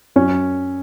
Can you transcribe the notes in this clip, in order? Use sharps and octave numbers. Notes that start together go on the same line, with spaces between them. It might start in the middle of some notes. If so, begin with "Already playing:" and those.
F#2 C#4 C#5